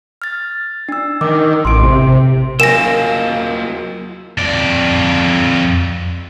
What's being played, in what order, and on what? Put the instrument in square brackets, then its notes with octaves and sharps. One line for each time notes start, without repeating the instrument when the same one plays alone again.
[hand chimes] F6 A6
D4 E6
[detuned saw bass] D#3 [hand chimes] D6
[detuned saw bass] A1 [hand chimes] C6 D7
[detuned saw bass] C3
[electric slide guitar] F#3 A#3 [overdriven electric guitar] F4 D#5 [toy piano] A#4 G#5 [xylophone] A#6 E7
[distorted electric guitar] F2 D5